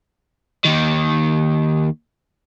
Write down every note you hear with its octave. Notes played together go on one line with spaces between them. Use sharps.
D#2 D#3